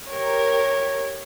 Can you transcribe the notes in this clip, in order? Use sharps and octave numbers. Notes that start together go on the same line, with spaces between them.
G4 A#4 C#5